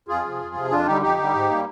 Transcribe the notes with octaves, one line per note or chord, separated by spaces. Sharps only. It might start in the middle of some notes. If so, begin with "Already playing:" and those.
F2 F4 G#4
C3 F3
F2
C3 F3
F2 D4 F4
D3 G3 D#4 G4
F2 D#4 G4
D3
G3
G#2
G3 A#3